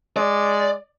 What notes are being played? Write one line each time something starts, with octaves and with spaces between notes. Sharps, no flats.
G#3 D5